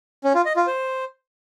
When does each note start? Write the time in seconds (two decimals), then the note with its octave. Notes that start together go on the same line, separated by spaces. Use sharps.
0.24 C#4
0.35 F4
0.46 D#5
0.56 F4
0.67 C5